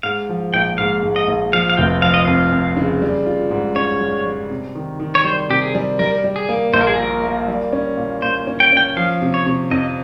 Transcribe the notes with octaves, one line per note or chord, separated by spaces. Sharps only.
G#2 F5
F3
A#1 G5
G#2 F5
G#2
D#5
A#1
F3 F5
F5
F1 G5
F3 F5
D#5
F2 F5
F2
C#3
G3
F4
G#2
C#4 C#5
G3
G3
C3
D#3
D#3
C#5
G3 C5
C3 G4
G#4
G3
G3 A#4
G3
G#4
A#3
A#1 C5
A#4
G#4
A#2 A#4
A#3
G3
C#4
A#2
A#2 C5
C#4
G5
C#4 G5
F3 F5
C3
C#5
C3
F2 D#5